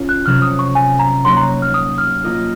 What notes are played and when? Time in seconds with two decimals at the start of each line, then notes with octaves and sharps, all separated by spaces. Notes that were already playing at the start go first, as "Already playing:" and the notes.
Already playing: G#3 C#4 F4 A#4
0.09 F#6
0.26 C3 F#3 C#4 F#4 F6
0.42 D#6
0.59 C#6
0.75 G#5
0.99 A#5
1.25 F#3 A#3 D#4 F#4 C#5 C6
1.37 A#5
1.62 F6
1.74 D#6
1.98 F6
2.24 A#3 F4 A#4 D#5